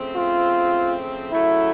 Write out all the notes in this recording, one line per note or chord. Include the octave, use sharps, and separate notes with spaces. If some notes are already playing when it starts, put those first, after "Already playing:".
Already playing: C#3 F3 A3 C4
F4
C#3 F#3 A3 E4